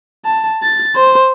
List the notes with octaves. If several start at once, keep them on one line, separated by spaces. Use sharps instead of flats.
A5
A6
C5